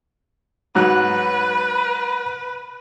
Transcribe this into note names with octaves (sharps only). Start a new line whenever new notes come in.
G#2 F#3 B4 F#6